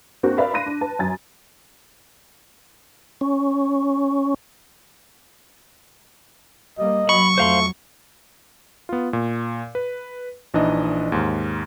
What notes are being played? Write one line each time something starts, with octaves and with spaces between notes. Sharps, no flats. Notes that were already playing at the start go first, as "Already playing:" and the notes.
A#3 C4 D4 F#4 A#4
A#4 B4 D5 E5 F5 B5
B5 C6 F#6 A#6 D#7
D4
B4 A5
F#2 G#5 A6
C#4
G3 A#3 D#5
F#3 B5 C#6
F2 F#3 A3 C5 F5 C6
B3 F4
A#2
B4
A#1 E3 D4 D#4 D#5
D#2 G#2